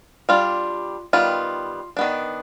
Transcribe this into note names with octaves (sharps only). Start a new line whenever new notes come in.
G3 D4 F4
D#3 G3 B3 F4
D#3 B3 D4